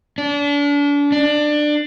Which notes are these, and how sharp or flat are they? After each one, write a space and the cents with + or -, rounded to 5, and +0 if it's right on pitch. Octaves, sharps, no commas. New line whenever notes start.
D4 -35
D4 +20